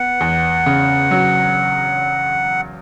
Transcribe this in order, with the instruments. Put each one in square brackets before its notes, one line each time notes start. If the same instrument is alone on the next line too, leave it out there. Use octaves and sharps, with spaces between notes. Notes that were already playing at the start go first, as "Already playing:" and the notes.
Already playing: [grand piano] B3 [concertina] F#5
[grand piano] E2
C#3
F#3